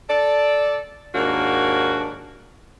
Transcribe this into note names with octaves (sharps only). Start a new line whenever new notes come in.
A4 D5
D#2 G#2 A#3 D4 F#4